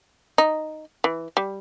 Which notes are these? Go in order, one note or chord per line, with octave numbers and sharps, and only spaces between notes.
D#4
E3
G3